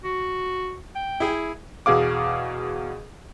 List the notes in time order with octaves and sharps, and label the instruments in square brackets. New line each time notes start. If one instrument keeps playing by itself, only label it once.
[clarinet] F#4
G5
[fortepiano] E4 G#4
[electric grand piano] E2 B2 G#4 F5 D6